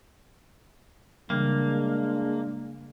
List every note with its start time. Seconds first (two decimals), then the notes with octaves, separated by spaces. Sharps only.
1.30 C#3 E3 G3 G#3 A#3 D4